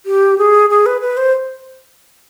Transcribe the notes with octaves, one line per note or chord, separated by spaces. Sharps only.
G4
G#4
G#4
B4
B4
C5